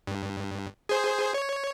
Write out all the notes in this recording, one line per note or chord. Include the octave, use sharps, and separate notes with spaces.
G2
G#4 C5
C#5